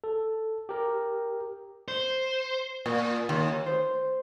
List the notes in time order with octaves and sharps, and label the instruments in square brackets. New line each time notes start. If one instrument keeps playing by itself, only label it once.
[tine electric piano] A4
G4 A#4
[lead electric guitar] C5
[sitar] A#2
D#2
[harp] C5